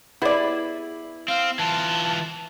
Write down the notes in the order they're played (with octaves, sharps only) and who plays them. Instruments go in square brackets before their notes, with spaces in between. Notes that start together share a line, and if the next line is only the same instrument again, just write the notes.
[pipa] B3 D5 [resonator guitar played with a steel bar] E4 G#4
[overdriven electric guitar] C4 [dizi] F5
[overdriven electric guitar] E3 F4 [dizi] A5